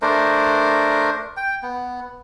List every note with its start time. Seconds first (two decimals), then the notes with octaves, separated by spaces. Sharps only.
0.02 A3 D4 A#4 C5
1.37 G5
1.63 B3